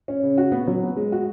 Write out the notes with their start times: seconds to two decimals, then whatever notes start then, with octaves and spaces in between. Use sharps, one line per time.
0.08 C#4
0.23 C#3
0.38 F#4
0.52 B3
0.67 F#3
0.83 B3
0.96 G#3
1.12 F#4